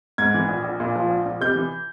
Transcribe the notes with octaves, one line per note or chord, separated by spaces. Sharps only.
G#2 G#6
E3
A#1
A#1
A#2
F3
A#1
A#1
C3 G6
E3